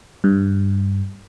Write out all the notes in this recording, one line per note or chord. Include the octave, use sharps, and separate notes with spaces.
G2